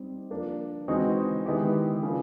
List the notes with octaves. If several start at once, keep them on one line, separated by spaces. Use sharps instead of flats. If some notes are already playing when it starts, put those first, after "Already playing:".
Already playing: G3 C4 D#4 G4
F3 A#3 D4
E3 G#3 C4 D#4 F#4
D#3 G#3 B3 E4 G4
C#3 F3 A#3 D4